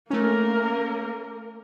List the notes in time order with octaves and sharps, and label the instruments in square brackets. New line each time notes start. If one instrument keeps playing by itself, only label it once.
[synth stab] A3 C#4 [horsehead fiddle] A#3 A#4